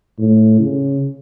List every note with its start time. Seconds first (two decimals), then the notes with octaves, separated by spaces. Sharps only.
0.19 A2
0.60 C#3